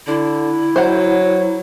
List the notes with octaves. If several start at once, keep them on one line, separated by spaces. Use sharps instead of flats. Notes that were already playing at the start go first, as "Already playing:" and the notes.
D3 E4
F#3 C5 F#5